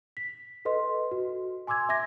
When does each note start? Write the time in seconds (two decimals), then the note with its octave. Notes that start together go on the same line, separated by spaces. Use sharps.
0.17 B6
0.65 A4 B4 D#5 C6
1.11 F#4
1.67 G#5 C6 D6 E6 G#6
1.89 E5 D6 G#6 A#6